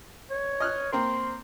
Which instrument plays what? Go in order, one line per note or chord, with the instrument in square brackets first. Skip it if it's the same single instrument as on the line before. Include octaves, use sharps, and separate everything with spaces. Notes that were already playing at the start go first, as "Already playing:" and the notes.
[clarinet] C#5
[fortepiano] D#5 F6 F#6
[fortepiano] A#3 C4 A#4 [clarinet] C6